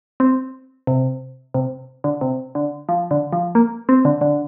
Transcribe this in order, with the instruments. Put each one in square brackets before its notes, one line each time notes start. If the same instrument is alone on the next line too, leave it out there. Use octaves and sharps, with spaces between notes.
[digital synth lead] C4
C3
C3
D3
C3
D3
F3
D3
F3
A#3
C4
D3
D3